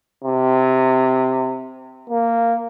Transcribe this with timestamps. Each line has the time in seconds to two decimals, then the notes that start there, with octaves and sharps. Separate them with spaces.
0.24 C3
2.10 A#3